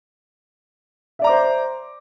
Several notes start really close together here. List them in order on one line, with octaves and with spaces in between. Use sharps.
E5 D5 A#5 D6 C5